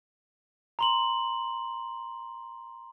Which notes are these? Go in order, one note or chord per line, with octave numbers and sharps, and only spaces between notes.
A#5 C6 F#7